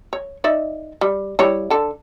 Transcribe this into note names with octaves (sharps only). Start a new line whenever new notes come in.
C#5
D#4 D5 E5
G3
G3 E4 C#5
D3 A4